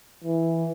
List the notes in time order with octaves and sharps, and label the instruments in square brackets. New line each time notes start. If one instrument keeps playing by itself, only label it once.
[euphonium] E3